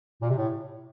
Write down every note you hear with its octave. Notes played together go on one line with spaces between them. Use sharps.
A#2
C3
A2